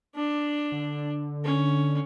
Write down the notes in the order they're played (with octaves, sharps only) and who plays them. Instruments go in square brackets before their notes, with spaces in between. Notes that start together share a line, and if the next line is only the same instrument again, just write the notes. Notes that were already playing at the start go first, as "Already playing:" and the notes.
[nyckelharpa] D4
[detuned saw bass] D3
[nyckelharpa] C#4